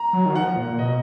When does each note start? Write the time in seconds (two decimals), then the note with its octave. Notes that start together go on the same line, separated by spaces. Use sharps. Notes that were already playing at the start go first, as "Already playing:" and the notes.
Already playing: A#5
0.13 F#3
0.26 D#3
0.35 F3 F#5
0.57 A#2
0.79 B2 D#5